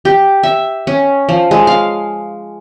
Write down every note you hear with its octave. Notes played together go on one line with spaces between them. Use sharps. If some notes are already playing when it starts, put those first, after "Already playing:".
G4
E5
C#4
F3
G#3
F5